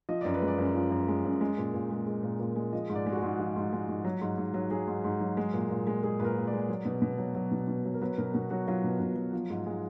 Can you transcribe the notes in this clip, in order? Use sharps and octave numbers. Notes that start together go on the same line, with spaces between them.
F3 D#5
F#2 D5
B4
G#3
D5
F#2
F3
F#2
G#3
F#2
G#3
A#2
A#2
G#3
G#3
A#2
A#2
G#3
F3 D#5
G#2
D5
G#3
F#4
G#4
G#2
F3 F4
G#2
G#3
G#2
F#3
G#2
G#2
F#3
F#3 G#4
G#2
G#2
F#3
G#3
A#2
A#2
G#3
G#3 G#4
A#2 A#4 B4
A#2
D5
G#3
F#3
B2
B2
F#3
F#3
B2
B2
F#3
A#4
F#3 B4
B2 A#4
B2 F#4
F#3 F#4
F#3 F4
B2
B2
F#3
F3
G#2
G#3